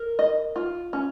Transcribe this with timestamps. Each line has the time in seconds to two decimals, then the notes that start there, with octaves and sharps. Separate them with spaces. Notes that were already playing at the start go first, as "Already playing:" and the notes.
Already playing: A#4
0.19 D#5
0.56 F4
0.93 C#4